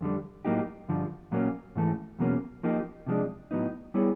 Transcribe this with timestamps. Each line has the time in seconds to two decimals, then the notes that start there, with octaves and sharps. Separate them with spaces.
0.01 F2 D3 G3
0.45 A2 F#3 A#3 D#4 G4
0.88 G2 D3 F3
1.32 A#2 F#3 A#3 C#4
1.76 G#2 E3 A3
2.19 E2 B2 F#3 A#3 C#4
2.63 F3 A#3 D#4 G4
3.06 C3 F3 G#3 B3 D4
3.51 A2 F#3 B3 D#4
3.94 G3 B3 E4 G#4 C#5